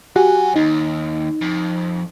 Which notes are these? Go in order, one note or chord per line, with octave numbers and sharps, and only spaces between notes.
F#3 F#4 G4 F#5 G#5
D#2 D#4
F2